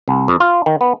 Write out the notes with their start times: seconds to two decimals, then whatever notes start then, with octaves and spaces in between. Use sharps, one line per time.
0.08 C2
0.28 F2
0.40 F4
0.66 D#3
0.81 B3